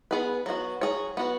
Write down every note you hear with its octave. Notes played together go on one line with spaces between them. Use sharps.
B3 G#4 B4
F#3 B3 F#4
F#3 C#4 G#4 C#5
B3 F#4 B4